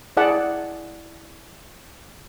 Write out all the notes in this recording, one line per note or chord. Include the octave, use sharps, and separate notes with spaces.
E4 G#4 D5 F#5 A5